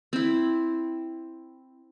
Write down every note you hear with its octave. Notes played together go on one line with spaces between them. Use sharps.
C4 E4